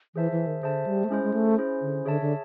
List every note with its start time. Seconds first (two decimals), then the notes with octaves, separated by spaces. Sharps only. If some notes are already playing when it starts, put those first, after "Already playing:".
0.15 E3 G#4 C5 E5 A5
0.32 E3
0.47 D#3
0.63 D3 G#4 C5 E5 A5
0.86 G3
1.04 A3
1.10 G#3 C#4 E4 G#4 C5
1.23 G#3
1.33 A3
1.58 C#4 E4 G#4 C5
1.81 D3
2.05 D3 G#4 C#5 E5 A5
2.21 D3